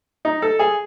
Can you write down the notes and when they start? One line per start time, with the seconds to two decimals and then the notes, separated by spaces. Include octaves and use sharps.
0.25 D#4
0.42 A4
0.59 G#4